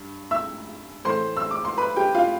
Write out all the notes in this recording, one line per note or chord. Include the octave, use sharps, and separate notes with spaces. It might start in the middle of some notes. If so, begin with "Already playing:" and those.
Already playing: G2
E5 E6
A2 E3 A3 C5 C6
E6
D6
C6
B4 B5
G4 G5
F4 F5